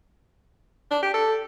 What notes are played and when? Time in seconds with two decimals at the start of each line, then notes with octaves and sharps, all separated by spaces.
0.91 D4
1.02 G4
1.14 A4